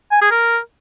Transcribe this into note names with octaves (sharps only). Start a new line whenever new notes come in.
G#5
G#4
A#4